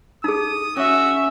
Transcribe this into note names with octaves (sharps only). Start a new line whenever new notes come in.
D#4 G#4 D#6
C#4 F#4 E5